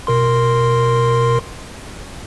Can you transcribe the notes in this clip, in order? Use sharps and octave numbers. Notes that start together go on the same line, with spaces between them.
B2 A#4 C6